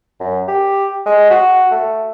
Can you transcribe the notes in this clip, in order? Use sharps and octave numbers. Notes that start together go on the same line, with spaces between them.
F#2
G4
G#3
F#4
A3